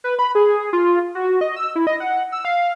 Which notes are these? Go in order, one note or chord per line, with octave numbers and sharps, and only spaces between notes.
B4
B5
G#4
F4
F#4
D#5
E6
E4
D#5
F#5
E6
F5